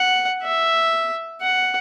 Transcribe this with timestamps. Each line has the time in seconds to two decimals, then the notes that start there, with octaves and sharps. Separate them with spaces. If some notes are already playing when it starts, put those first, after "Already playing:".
Already playing: F#5
0.43 E5
1.42 F#5